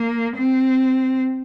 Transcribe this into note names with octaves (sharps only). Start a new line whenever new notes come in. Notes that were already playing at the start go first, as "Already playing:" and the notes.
Already playing: A#3
C4